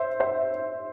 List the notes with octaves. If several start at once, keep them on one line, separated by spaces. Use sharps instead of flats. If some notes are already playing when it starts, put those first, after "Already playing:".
Already playing: C5 E5
C5 E5